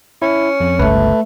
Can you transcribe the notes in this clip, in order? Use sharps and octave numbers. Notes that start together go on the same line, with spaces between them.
C#4 E4
F2
G1 C#2 A3 B4